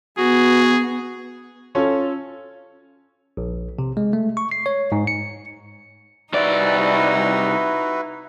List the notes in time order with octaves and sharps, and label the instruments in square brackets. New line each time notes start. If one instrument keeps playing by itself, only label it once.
[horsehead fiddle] B3 [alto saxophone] F#4 [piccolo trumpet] G#4
[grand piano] C#4 F4 A4 C#5
[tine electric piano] A#1
C3
G#3
A3
C#6
C7
C#5
G#2
C#7
[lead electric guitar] C2 D5 [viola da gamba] D#4 [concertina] E4 F#4 B4